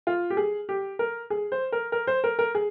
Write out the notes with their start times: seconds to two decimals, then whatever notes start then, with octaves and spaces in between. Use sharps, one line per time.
0.07 F4
0.30 G4
0.37 G#4
0.69 G4
0.99 A#4
1.30 G#4
1.52 C5
1.72 A#4
1.92 A#4
2.07 C5
2.24 A#4
2.39 A#4
2.55 G#4